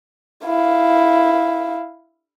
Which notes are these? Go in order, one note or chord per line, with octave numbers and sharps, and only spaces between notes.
E4 F5